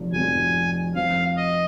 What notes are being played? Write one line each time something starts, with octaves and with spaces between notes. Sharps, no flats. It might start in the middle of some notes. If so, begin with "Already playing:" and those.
Already playing: F1 F2 F3
F1 F2 F3 G#5
F2 F3 C4 F5
D#5